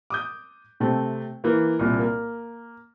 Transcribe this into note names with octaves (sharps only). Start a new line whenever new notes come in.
D6 D#6 G6
C3 A3 C4
E3 A#3
C2 A#2
A#3